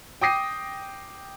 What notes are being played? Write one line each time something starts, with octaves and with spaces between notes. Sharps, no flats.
G5 D6 D#6 A#6 C7 D#7